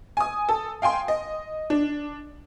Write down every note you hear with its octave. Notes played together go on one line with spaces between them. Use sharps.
G#5 D#6
A4
F5 G5 G#5 C6
D#5
D4